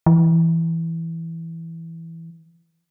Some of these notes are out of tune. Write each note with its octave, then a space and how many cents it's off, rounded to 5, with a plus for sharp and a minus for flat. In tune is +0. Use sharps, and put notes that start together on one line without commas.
E3 +0